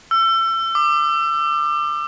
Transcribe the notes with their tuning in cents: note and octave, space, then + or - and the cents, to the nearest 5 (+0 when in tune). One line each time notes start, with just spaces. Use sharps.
E6 +30
D6 +30